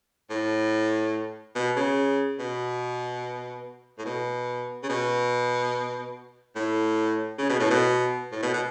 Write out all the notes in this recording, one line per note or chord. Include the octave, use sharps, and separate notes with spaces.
A2
B2
C#3
B2
A2
B2
C#3
B2
A2
C#3
B2
A2
B2
A2
B2
B2